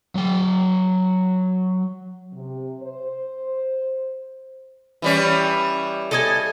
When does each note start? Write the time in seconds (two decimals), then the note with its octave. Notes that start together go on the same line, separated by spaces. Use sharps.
0.15 F#3 G5
2.34 C3
2.82 C5
5.02 E3 G3 C#4
6.11 A4 D#5 G#5